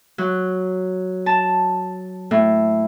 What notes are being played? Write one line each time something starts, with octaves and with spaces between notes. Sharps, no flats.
F#3
A5
A2